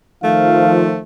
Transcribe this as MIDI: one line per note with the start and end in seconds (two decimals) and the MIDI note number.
0.24 1.01 51
0.24 1.01 53
0.24 1.03 57
0.24 0.78 77